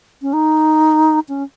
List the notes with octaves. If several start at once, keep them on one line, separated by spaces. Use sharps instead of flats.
C#4
D#4
C#4